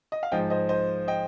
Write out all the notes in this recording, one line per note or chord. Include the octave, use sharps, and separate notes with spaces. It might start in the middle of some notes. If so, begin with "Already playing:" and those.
D#5
F5
G#2 F3 D#5 G5
C5 D#5
C5 D#5
D#5 G5